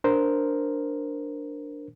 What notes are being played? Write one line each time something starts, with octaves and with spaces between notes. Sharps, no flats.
D4 A#4 C5